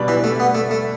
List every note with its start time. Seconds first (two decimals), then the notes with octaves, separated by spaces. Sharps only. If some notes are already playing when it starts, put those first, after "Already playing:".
Already playing: B2 G3 D4 B4 D5
0.08 E3
0.24 A3
0.40 B3
0.55 A3
0.71 A3